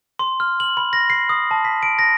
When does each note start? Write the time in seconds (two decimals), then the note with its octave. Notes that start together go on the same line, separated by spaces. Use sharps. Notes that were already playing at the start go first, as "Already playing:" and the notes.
0.19 C6
0.40 F6
0.60 F#7
0.77 B5
0.93 A#6
1.10 C7
1.29 D#6
1.51 A5
1.65 B6
1.83 D7
1.99 A#6